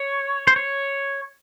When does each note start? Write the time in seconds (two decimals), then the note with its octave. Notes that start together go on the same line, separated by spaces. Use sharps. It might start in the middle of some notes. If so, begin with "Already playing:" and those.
Already playing: C#5
0.47 C5
0.56 C#5